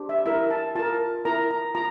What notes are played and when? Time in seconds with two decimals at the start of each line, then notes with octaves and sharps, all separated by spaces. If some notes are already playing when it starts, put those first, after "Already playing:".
Already playing: D4 G4 C5
0.09 E5
0.26 E4 A#4 E5
0.51 A5
0.75 F4 A#4 A5
1.25 E4 A#4 A#5
1.51 A#5
1.75 F4 A#5